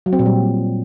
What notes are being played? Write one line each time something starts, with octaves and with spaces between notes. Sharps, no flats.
F#3
C4
A#2
G3